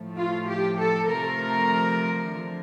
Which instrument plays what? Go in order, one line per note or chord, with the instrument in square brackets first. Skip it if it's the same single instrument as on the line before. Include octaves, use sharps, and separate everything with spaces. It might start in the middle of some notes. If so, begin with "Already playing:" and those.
Already playing: [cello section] A2 F3 A3
F4
G4
A4
C3 F3 A3 A#4
D3 F3